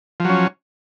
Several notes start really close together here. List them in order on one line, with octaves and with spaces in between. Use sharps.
F3 F#3 C#4